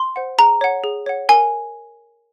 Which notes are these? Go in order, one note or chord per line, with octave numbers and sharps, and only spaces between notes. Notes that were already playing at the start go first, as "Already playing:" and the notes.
Already playing: C6
C5 F#5
G#4 A#5
C#5 F#5
G#4
C#5 F#5
A#4 G#5